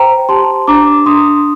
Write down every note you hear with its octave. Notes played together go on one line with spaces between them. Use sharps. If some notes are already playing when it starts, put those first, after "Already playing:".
Already playing: C5 G5 A#5
G4 A5 C6
D4 A#5 D6
D4 C6 D#6